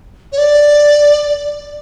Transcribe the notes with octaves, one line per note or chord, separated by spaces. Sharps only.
C#5
D5